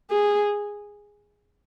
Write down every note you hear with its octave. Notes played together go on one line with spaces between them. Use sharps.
G#4